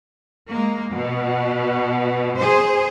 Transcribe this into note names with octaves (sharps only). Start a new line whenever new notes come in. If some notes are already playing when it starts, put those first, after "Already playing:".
G#3 A#3
B2
G#4 C5